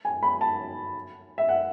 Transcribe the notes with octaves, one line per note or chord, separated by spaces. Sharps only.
G#5
B5
A5
E5
F#5